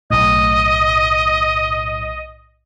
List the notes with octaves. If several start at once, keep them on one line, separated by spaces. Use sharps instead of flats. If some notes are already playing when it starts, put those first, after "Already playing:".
B1 A2 D#5